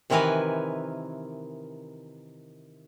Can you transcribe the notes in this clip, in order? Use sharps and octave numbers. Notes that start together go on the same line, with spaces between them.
C3 D#3 E3 A#4 B4 G#5